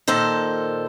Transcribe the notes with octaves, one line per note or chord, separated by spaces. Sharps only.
A#2 D#3 A4 C5